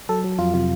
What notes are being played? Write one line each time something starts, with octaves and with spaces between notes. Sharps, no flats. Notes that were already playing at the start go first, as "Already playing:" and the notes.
F#3 A4
F#3
F2 F4
C3 F4